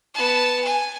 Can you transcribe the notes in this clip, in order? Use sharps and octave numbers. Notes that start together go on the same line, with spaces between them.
B3 A5
G#5